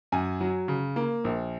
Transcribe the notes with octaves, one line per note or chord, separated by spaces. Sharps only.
F#2 G#5
F#3
C#3
A#3
A#1